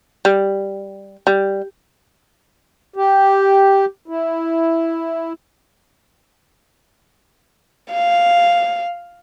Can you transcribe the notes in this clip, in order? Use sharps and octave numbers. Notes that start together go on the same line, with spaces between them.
G3
G3
G4
E4
F5